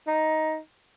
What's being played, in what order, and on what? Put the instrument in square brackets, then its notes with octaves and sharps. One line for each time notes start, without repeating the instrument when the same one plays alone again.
[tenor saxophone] D#4